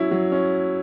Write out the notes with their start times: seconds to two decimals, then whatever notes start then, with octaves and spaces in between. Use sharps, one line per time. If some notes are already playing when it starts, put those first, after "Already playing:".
Already playing: F#3 C#4 E4
0.11 F#3
0.32 C#4